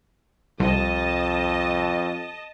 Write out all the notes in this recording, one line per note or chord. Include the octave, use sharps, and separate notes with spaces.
C2 F2 D#5 A5